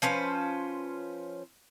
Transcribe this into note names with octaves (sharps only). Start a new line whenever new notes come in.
F3 C#4 B4 C5